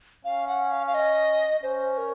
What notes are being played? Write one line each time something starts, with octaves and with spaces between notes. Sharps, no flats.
C#4 F5
F#5
F5
F5
D#5
C#4 C5
A#4